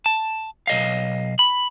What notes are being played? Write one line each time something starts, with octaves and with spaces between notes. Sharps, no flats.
A5
B1 D#5 F5
B5